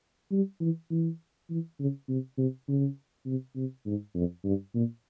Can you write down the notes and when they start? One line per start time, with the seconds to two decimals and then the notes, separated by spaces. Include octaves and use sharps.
0.32 G3
0.61 E3
0.91 E3
1.50 E3
1.80 C#3
2.09 C3
2.38 C3
2.68 C#3
3.26 C3
3.56 C3
3.86 G#2
4.15 F2
4.44 G2
4.75 A#2